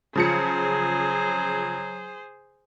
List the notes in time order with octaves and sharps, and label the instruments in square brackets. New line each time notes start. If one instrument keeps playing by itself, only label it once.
[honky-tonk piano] C#3 F3 C#7 [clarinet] F#3 [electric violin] G#4 C5